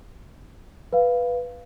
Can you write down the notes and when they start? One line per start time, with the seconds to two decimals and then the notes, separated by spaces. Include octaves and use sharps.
0.93 B4 F5